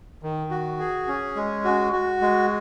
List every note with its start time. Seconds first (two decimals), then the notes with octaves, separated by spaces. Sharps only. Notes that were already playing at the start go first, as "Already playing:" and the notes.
0.23 D#3
0.51 F#4
0.79 G#4
1.08 C#4
1.36 G#3
1.65 F#4
1.93 F#4
2.22 G#3